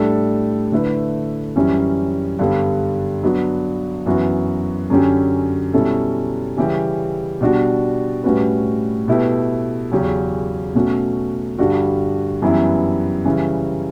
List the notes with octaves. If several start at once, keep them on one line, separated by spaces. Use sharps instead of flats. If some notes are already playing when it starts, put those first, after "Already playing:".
Already playing: A2 G3 D4 A4
D3 A3 E4 B4
F#2 E3 G3 C#4
G2 D3 G3 B3
F#3 B3 D4 F#4
F#2 E3 B3 F#4
F#2 D3 F#3 C#4 G4
B2 G3 C#4 E4 A4
C#3 E3 G3 C#4 G4
B2 G3 D4 F#4
A2 G3 C#4 F#4 B4
B2 A3 E4 G4 B4
E2 C#3 F#3 C#4 G4
B2 A3 C#4 F#4
G2 D3 G3 D4 F#4
F#2 E3 G3 B3 E4
C#3 E3 G3 C#4